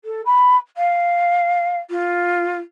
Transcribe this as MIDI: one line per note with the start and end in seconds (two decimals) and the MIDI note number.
0.04 0.21 69
0.25 0.56 83
0.76 1.79 77
1.90 2.58 65